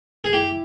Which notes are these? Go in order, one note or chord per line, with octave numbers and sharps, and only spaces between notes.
G#4
E4 G4